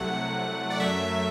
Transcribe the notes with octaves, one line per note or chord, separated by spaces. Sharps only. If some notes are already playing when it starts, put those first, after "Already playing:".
Already playing: C2 C3 F#3 A3 F#5
D5
F#2 F#3 A3 E5